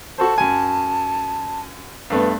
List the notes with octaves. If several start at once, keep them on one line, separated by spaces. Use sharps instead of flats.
F#4 A4 C5 A5
F#2 G#5
G2 A3 B3